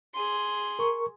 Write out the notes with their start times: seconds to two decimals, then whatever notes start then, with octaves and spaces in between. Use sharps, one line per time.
0.15 G#4 C6
0.79 A#4 C#6